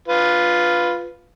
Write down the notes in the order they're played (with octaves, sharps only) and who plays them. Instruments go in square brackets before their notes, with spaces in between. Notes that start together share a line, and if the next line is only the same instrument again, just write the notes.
[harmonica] F4 B4